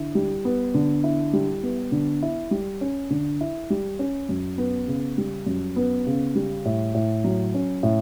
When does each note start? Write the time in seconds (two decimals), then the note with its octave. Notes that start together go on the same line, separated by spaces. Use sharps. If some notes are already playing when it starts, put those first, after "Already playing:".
Already playing: D3 E4
0.15 G3
0.45 B3
0.74 D3
1.04 E4
1.33 G3
1.63 B3
1.92 D3
2.22 E4
2.51 G3
2.81 C#4
3.10 D3
3.41 E4
3.70 G3
3.99 C#4
4.29 F#2
4.58 B3
4.88 C#3
5.18 G3
5.46 F#2
5.76 B3
6.07 C#3
6.35 G3
6.65 A2
6.94 A2
7.24 F#3
7.54 C#4
7.83 A2